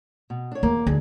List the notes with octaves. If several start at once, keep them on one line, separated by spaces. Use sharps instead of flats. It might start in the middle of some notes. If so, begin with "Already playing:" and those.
B2
D4 C#5
E2 A#3
D2 G#4